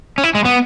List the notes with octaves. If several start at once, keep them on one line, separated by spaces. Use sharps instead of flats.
C#4
E4
G#3
B3